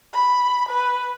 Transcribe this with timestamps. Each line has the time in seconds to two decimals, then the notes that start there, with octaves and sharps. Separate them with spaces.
0.13 B5
0.69 B4